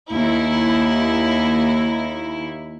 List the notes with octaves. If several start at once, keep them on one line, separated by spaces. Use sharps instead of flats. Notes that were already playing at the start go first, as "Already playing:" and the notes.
D#2 E4